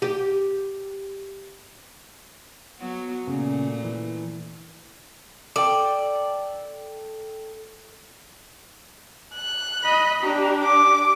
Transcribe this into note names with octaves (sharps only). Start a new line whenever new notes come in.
G4
F#3 B3 F#4
A#2 C#3 A3
E3
A4 D5 G5
F#6
D#5 B5
D4 G4 A#5
D6